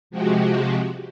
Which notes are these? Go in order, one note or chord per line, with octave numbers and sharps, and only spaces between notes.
C3 F3 G#3 F#4 G4